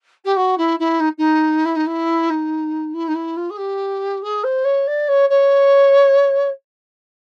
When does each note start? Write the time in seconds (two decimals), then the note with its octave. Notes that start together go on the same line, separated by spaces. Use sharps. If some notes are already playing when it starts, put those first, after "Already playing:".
0.24 G4
0.36 F#4
0.57 E4
0.79 E4
1.00 D#4
1.18 D#4
1.65 E4
1.76 D#4
1.86 E4
2.30 D#4
2.94 E4
3.08 D#4
3.14 E4
3.36 F4
3.50 G#4
3.57 G4
4.22 G#4
4.43 C5
4.64 C#5
4.87 D5
5.08 C#5
5.29 C#5